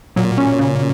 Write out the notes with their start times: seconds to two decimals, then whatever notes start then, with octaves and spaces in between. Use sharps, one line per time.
0.16 A#2 F#3
0.38 C#4
0.59 C#3